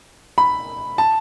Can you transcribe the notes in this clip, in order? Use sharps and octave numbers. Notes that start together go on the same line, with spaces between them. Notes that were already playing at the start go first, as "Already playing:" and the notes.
B5
A5